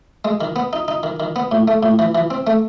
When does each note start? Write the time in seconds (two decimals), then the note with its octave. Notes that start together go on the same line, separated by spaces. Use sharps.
0.25 G#3
0.41 D#3
0.56 B3
0.73 D#4
0.88 D#4
1.03 D#3
1.20 D#3
1.36 B3
1.52 A2
1.68 A3
1.83 A2
1.99 E3
2.15 E3
2.30 C4
2.47 A3